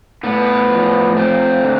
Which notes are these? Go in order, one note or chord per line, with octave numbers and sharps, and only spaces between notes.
A2 B3
F3
A3 C4
D3